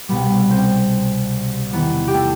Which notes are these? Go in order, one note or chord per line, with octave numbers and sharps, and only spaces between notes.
C2 B2 G3 B3 B4
C4 C5
E2 C3 D#3 B3 B4
G4
A3 A4